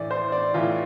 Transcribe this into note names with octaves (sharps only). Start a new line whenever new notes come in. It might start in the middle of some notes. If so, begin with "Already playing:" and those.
Already playing: A2 E3 D5
C5
D5
A2 E3 F4